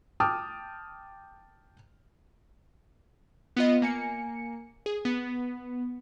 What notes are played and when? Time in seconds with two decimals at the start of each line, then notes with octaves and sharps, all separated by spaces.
0.20 G5 A5 D6 D#6 F6
3.57 B3 F4 D#5
3.82 A#3 G#5 C#7
4.86 G#4
5.05 B3